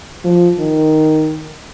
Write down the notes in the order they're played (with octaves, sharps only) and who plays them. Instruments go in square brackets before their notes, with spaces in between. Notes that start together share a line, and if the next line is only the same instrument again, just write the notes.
[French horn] F3
D#3